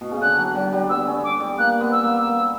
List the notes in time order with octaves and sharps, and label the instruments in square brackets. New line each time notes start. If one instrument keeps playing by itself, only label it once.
[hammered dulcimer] B2
C#3
[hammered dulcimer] D3 [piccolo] F#6
[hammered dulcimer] F#3
F#3
G3
[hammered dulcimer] B3 [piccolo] E6
[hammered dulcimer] C#4
[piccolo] D6
[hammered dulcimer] G3
[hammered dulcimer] A#3 [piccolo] F#6
[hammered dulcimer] B3
[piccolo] E6
[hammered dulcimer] A#3
B3